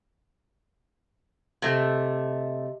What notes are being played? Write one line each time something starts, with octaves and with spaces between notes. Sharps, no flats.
C3 A3 G4 D#5 E5